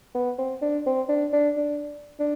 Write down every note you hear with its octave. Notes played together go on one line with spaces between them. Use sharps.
B3
C4
D4
C4
D4
D4
D4
D4